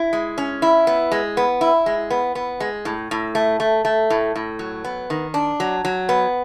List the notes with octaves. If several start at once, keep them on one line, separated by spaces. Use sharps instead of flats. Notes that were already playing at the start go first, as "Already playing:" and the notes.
Already playing: E4
G#3
C#4
E4
B3
G#3
B3
E4
G#3
B3
B3
G#3
A2
A2
A3
A3
A3
A2
A2
F#3
B3
D#3
D4
F#3
F#3
B3